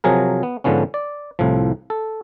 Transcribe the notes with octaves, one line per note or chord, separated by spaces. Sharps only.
C3 F3 F#3 G#4 A#4
B3
G#2 D3 F3 B3 C#4
D5
C2 A2 F3
A4